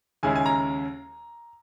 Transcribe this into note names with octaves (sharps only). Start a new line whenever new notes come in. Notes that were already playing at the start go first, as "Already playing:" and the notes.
D#2 C#3 G#3 C#4 E4 G#5
G#5
A#5